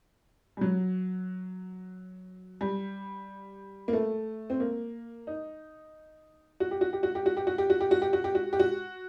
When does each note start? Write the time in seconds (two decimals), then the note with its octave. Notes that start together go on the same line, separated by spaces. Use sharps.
0.57 G3
0.61 F#3
2.61 G3
3.88 A#3
3.93 A3
4.50 C4
4.60 A#3
5.27 D#4
6.60 F#4
6.71 G4
6.81 F#4
6.93 G4
7.03 F#4
7.15 G4
7.26 F#4
7.37 G4
7.47 F#4
7.58 G4
7.70 F#4
7.81 G4
7.91 F#4
8.02 G4
8.13 F#4
8.24 G4
8.35 F#4
8.53 G4
8.60 F#4